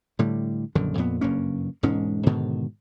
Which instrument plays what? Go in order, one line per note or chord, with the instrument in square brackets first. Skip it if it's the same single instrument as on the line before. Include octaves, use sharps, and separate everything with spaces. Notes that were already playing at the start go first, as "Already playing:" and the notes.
[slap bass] A2 D3 G3
A#1 F#2 D3 D#3
F2 A#2 B3
F#1 G2 A#3 C#4
E1 G#2 G#3 C#4
G#2 B2 D3 D#3